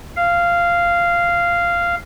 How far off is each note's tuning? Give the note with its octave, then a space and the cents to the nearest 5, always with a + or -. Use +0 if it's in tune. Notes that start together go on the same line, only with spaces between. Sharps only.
F5 -10